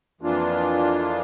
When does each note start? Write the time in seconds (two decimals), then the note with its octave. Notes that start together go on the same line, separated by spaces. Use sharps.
0.21 F2 E3 A#3 D4 F4